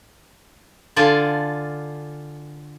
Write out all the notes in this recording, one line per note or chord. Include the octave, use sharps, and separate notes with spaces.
D3 F4 D5 F5 G#5 A5